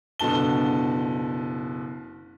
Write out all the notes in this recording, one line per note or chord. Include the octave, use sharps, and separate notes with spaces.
F#1 B2 D3 A5 G7